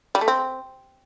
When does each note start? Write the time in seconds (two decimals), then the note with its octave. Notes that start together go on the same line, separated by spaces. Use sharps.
0.15 G3
0.21 A3
0.28 C4